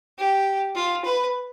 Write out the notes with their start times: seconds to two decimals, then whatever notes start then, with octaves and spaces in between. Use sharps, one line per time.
0.19 G4
0.76 F4
1.05 B4